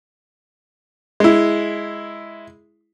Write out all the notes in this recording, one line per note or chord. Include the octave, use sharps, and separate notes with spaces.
G#3 E4